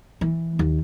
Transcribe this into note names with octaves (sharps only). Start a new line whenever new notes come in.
E3
D#2